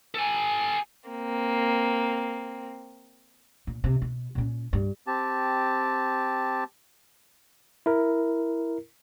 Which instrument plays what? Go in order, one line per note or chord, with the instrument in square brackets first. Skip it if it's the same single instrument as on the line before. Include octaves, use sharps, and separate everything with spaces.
[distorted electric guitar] A4 G#5
[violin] A#3 C4
[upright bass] A#2
C3
B2
A#2 C#4
G2
[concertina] C4 G4 A5
[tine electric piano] E4 A#4